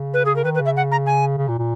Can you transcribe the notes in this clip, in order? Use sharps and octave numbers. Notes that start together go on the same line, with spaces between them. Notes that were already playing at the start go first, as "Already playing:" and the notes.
Already playing: C#3
B4
G#4
A#4
D#3 B4
B4
C#3
E5
F#5
A#5
G#5
C#3
A#2
A#2